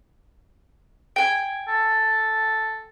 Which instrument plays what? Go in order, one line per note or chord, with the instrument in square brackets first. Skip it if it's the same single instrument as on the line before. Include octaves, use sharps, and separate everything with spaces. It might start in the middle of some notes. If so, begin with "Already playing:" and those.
[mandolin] G5 G#5
[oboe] A4